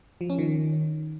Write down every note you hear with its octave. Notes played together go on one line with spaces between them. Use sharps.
F3
C#4
D#3